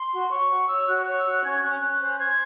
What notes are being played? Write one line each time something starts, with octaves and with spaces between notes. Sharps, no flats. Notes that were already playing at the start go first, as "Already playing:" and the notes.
Already playing: C6
F#4
C#5 C#6
F#4
C#5 E6
F#4 F#6
C#5 F#6
E6
F#4
F#6
C#4 G#6
C#4 F#6
C#4 F#6
C5
C5 G#6